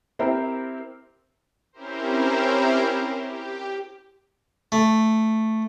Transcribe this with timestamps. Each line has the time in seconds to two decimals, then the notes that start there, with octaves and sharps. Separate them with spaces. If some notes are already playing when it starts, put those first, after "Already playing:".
0.19 C4 E4 G4 A#4 C5
1.72 C4 C#4 E4 G4 A#4 C5
3.22 G4
4.72 A3